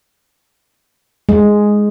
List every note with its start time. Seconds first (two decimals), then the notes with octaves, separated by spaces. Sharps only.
1.29 G#3